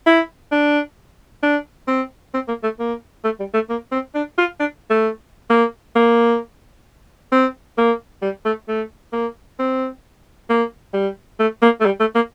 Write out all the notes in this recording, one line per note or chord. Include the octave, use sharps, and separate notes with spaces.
E4
D4
D4
C4
C4
A#3
A3
A#3
A3
G3
A3
A#3
C4
D4
F4
D4
A3
A#3
A#3
C4
A#3
G3
A3
A3
A#3
C4
A#3
G3
A3
A#3
A3
G3
A3
A#3